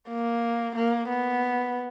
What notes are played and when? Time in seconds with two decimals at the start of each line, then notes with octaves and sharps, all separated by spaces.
0.09 A#3
0.76 A#3
1.09 B3